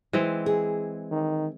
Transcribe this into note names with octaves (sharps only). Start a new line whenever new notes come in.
E3 G#3 C4
G#4
D#3